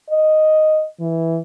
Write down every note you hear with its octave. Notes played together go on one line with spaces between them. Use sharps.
D#5
E3